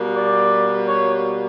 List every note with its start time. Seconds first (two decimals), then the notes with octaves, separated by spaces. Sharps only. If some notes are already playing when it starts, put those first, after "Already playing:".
Already playing: B2 G3 A#3
0.14 D5
0.88 C#5